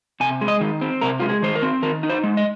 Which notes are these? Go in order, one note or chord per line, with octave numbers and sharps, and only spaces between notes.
C3 G#5
G#3
D#5
D#3
C4
C3 A#4
G#3 F4
G#4
D#3 C5
A#4
C4
D#3 A#4
D#4
C5
G#3
D#5